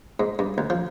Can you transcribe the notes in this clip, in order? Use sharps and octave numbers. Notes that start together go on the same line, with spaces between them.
G#2
G2
D2
F3